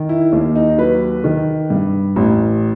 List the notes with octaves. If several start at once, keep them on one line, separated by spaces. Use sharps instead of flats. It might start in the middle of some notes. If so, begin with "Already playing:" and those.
Already playing: D#3
E4
D#2
D#4
F#3 B4
D#3
G2
A1